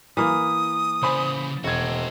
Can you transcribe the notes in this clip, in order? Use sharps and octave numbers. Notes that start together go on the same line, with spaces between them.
E3 A#3 D#6
C#3 C5 D5 G#5 B5
E1 F#4 C5 G#6